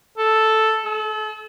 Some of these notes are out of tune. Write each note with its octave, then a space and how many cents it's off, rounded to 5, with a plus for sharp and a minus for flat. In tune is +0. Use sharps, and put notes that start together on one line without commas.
A4 +0
A4 -35